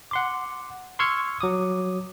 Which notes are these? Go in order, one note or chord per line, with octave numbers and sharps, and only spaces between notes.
F#5 C6 D6
C6 C#6 E6 F6 G#6 C#7
F#3 D6 D#6